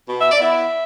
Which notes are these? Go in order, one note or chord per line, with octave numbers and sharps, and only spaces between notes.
B2
E5
D5
B3 E4 E5